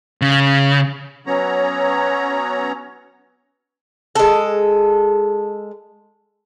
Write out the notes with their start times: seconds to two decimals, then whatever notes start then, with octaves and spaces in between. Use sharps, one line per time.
0.21 C#3
1.27 F#3 B3 C#4 C#5 A#5
4.15 G#3 A4